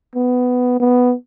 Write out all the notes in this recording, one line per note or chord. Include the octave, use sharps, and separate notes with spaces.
B3
B3